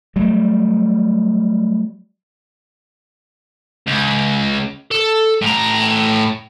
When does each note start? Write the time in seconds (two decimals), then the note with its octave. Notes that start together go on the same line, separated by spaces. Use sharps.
0.16 F#3 G3 A3
3.87 C#2
4.91 A4
5.42 A2 A#5